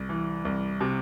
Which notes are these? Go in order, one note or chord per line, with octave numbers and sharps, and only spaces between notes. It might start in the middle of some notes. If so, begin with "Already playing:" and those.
Already playing: C2
E3
C2
C3